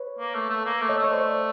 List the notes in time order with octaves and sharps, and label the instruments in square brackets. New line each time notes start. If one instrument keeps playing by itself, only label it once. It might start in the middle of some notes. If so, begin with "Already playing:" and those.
Already playing: [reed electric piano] B4 C#5
[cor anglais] A#3
A3
A3
A#3
A3
[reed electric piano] C#5 D#5
[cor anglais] A3
[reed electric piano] C#5
C5 D5